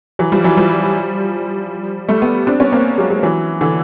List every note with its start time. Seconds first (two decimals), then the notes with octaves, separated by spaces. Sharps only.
0.19 E3 F#3
0.32 F3 G3
0.44 E3 F#3
0.57 F3 G3
2.09 G3 A3
2.22 A3 B3
2.47 C4 D4
2.60 B3 C#4
2.72 A#3 C4
2.98 F#3 G#3
3.10 F#3 G#3
3.23 E3 F#3
3.61 D3 E3